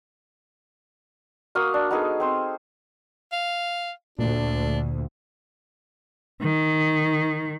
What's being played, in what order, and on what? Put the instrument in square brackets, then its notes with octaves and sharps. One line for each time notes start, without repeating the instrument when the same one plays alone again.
[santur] A#3 F#4 F5 D#6
D4
B3 D#4 G#4 A4
C4 C5
[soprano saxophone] F5
[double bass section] D2 [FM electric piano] A#2 A3 [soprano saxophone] D4
[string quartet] D#3